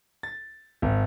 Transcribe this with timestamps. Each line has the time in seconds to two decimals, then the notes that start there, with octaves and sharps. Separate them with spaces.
0.23 A6
0.82 G#1